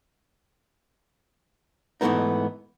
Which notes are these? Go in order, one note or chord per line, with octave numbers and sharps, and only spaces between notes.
G#2 E3 F#3 A3 B3 D#4